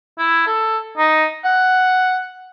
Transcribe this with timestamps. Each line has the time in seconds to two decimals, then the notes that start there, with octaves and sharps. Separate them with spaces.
0.19 E4
0.47 A4
0.97 D#4
1.44 F#5